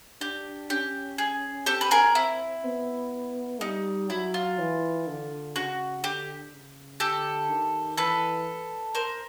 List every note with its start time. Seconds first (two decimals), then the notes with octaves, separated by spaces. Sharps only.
0.21 D4 G4
0.70 C#4 G4
1.18 G#4
1.66 C4 G4 A4
1.81 B4
1.91 G#4 A#4
2.15 E4
2.64 B3
3.61 G3 D#4
4.09 F#3 E4
4.34 F4
4.59 E3
5.07 D3
5.55 C#3 F#4
6.03 D3 G4
6.52 C#3
7.00 D3 G4 A4
7.49 D#3
7.97 E3 A4 B4
8.95 A#4 C5